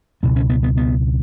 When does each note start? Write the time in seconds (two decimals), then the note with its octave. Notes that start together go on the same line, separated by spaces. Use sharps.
0.23 C#2 B2 B3
0.36 C#4
0.50 B3
0.63 B3
0.77 B3